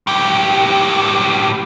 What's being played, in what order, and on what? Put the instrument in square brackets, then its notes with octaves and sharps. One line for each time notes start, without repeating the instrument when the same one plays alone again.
[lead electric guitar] A2 G4